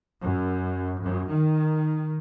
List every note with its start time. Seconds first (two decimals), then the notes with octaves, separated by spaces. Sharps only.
0.21 F#2
0.99 F#2
1.29 D#3